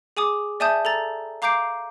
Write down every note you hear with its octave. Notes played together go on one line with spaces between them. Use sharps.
G#4 G#5 D6 D#6
D5 E5 G#5 A5 D#6 G6
A4 A#5 A6
F5 A#5 D6 G6 C7 D7